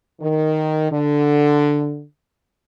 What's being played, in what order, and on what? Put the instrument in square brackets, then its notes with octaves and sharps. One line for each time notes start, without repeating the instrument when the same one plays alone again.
[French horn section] D#3
D3